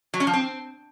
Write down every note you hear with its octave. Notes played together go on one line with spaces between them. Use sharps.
F#3
C#4
F3
C4